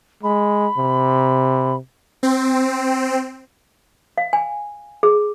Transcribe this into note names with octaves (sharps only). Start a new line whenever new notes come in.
G#3 B5
C3
C4
F5
G#5
G#4